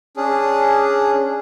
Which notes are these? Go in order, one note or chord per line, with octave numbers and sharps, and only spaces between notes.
C#4 D4 G#4